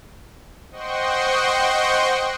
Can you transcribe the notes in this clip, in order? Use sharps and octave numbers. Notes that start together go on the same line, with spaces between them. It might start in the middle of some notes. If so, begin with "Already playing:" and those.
C5 D#5 F#5 G5 C6 C#6